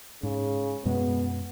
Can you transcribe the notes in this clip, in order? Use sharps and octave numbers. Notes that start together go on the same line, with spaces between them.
G#2 C#3
F#2 B2 G#3 B3